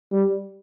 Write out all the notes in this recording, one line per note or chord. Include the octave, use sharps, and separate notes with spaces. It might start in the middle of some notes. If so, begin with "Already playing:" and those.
G3